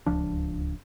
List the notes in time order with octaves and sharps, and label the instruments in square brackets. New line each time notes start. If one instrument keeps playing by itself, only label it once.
[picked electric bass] D1 C#2 F3 D4